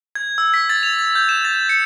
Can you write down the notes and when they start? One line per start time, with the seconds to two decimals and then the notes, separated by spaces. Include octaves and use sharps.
0.15 G#6
0.38 E6
0.54 B6
0.70 A6
0.83 F7
0.99 A6
1.15 G6
1.29 E7
1.45 A6
1.69 C#7